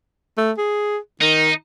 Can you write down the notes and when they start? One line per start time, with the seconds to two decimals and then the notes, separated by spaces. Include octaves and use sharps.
0.37 A3
0.58 G#4
1.21 D#3 D#4